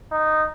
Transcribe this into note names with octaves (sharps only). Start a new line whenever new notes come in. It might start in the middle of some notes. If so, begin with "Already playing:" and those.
D#4